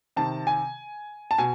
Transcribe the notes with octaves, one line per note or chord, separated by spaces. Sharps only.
C3 D#3 A5
G#5
A5
B2 G#5